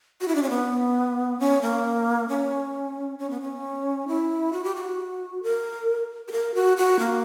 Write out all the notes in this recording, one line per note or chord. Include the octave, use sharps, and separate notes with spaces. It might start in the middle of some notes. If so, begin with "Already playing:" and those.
F#4
E4
D4
C#4
B3
C#4
A#3
C#4
C#4
B3
C#4
E4
F#4
G4
F#4
A#4
G4
A#4
F#4
F#4
A#3